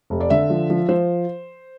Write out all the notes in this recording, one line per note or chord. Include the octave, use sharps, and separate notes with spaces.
F1
D5
D3 E5
F3
F3
F3 C5